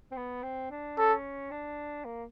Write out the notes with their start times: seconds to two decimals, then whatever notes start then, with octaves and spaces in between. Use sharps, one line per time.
0.12 C4
0.17 B3
0.43 C4
0.70 D4
0.97 C#4 A4
1.51 D4
2.05 A#3